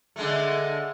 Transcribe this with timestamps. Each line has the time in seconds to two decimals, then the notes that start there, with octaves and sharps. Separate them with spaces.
0.16 D3 G#3 A3